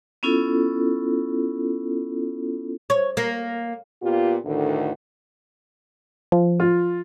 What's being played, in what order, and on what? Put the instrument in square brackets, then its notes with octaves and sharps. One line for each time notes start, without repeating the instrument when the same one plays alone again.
[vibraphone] B3 C#4 E4 F4 A4
[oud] C#5
A#3
[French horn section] A#2 B3 F4 G4
D2 A2 D3 D#3
[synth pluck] F3
[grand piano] F4